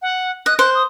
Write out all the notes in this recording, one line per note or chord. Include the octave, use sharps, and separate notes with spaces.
F#5
D#5 F#6
C5 F#6
D#6